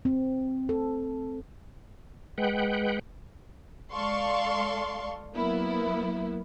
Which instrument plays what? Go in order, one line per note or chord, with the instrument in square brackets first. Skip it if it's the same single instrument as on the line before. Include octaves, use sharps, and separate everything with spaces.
[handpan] C4
A4
[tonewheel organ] G#3 B4 F#5 G5
[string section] G#3 A4 D5 F5 C6 C#6
F#3 A#3 B3 E4